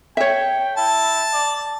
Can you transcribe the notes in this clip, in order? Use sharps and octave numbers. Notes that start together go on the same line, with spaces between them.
C#5 E5 G5
E4 A5
D5